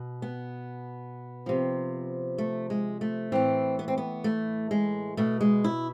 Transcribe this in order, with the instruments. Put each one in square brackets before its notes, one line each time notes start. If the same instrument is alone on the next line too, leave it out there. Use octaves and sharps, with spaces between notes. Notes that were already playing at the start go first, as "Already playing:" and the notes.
Already playing: [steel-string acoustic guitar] B2
B3
C3 F3
A3
G#3
A3
A2 E3 C4
B3
C4
B3
A3
G#3
B2 A3
G#3
E4